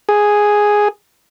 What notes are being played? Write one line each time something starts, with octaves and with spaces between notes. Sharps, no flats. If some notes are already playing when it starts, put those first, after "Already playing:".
G#4